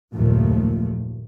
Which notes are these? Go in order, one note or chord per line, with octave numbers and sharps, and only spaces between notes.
F#1 D#2 A#2 F3 A3